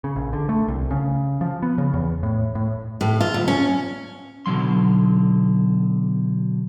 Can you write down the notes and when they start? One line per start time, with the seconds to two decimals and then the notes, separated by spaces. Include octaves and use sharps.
0.04 C#3
0.16 A#1
0.33 D3
0.49 A3
0.68 C2
0.91 C#3
1.41 F3
1.62 B3
1.78 C#3
1.93 E2
2.23 A2
2.55 A2
3.01 A2
3.21 F4
3.34 D2
3.48 C#4
4.46 B2 D3 F#3 C6